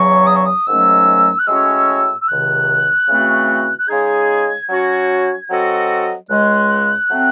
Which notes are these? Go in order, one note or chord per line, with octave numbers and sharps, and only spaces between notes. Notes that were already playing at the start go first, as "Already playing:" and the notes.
Already playing: E2 C#3 F#3 C#6
D#6
C#6
D#6
G#2 D#3 F#3 A3 C#4 E6
F#6
A2 G#3 C#4 F#4 C#5 E6
E6
C#2 C3 D#3 F#6
C#3 E3 A3 C4 F#4
F#6
C#3 G#3 D#4 G#4 G#6
F#3 C#4 F#4
F#3 C4 F#4 A4 D#5
C#2 C#3 G#3 F#6
F#3 A3 C4